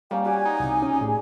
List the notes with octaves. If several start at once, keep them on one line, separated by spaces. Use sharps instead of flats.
G3 A#3 C#4 G5
F#4 G4 D5 G#5
D#4
C2 C3
C#4
A2 G#4